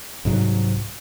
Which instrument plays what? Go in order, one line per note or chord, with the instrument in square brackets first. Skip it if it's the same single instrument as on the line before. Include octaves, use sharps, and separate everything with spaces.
[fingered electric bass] C2 G#2 F#3